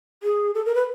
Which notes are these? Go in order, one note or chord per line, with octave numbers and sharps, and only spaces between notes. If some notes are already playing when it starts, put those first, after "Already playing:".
G#4
A4
A#4
B4